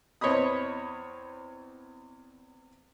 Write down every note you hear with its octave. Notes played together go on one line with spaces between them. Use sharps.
E2 C4 C#5 D#5 B5 D#6